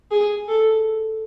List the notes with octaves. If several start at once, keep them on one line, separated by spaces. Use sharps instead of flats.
G#4
A4